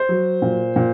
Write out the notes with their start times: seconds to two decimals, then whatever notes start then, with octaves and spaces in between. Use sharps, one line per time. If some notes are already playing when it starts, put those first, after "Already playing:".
Already playing: C5
0.09 F#3
0.42 A#2
0.76 A#2